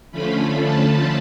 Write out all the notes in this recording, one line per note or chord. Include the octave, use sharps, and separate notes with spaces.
D3 F3 A3 C#4 F4 B5
A5